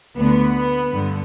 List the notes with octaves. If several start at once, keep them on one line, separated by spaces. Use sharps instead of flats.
D2 D3 B3
G2 D3